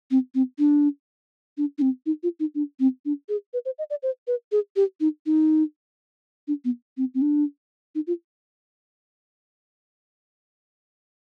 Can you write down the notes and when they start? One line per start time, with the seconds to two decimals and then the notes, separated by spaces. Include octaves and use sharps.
0.11 C4
0.35 C4
0.59 D4
1.58 D4
1.78 D4
1.82 C4
2.06 D#4
2.23 F4
2.40 D#4
2.55 D4
2.80 C4
3.05 D4
3.29 G#4
3.53 B4
3.65 C5
3.79 D#5
3.90 D5
4.03 C5
4.27 B4
4.52 G#4
4.76 G4
5.00 D#4
5.26 D#4
6.48 D4
6.65 B3
6.97 C4
7.14 C4
7.22 D4
7.95 D#4
8.07 F4